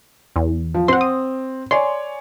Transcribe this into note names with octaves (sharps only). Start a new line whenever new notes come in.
E2
F3
C4 F#5 C6
D#6
C#5 D5 G#5 C6